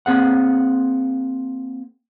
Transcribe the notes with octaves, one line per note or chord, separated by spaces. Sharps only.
A#3 C4 G#4 F#5